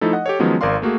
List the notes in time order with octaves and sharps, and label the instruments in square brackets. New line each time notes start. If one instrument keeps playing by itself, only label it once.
[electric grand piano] F3 A3 D#4 E4 A4
D#5 F#5
G4 A4 C#5
D#3 F3 F#3 G#3 B3 C#4
G#1 A#4 D5 F5 C6
A3 A#3 F#4 G#4